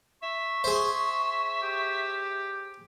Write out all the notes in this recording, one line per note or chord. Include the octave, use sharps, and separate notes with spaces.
E5 C#6
G#4 C5 E5
G4